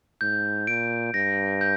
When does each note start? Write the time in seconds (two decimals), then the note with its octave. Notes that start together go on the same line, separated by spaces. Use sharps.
0.21 G#2 G6
0.67 A#2 D7
1.13 G2 A#6
1.61 G6